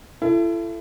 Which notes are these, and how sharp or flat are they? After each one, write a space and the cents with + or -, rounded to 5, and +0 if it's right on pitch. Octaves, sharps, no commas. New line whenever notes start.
E4 +35 A4 +0